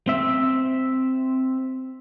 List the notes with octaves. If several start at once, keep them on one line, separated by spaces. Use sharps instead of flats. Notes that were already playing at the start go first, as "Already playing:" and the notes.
C4 E5